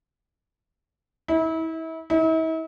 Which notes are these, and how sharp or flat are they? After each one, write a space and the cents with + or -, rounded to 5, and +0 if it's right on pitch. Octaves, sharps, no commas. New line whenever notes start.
E4 -35
E4 -45